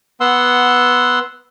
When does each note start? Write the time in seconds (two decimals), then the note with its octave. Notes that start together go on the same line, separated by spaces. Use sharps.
0.21 B3 F#5 C6 E6